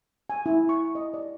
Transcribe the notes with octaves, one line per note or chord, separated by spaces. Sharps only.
G#5
E4
C#6
D#5
D5